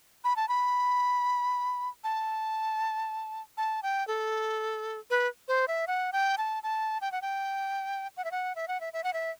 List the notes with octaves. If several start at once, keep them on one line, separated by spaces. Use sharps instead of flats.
B5
A5
B5
A5
A5
G5
A4
B4
C5
E5
F#5
G5
A5
A5
G5
F#5
G5
F#5
E5
F#5
E5
F#5
E5
E5
F#5
E5